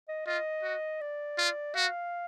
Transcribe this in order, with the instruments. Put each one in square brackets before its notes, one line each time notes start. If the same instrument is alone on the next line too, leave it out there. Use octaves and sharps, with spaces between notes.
[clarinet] D#5
[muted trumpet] F4 [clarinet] D#5
[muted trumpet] F#4
[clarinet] D5
[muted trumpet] F4
[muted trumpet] F#4 [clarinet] F5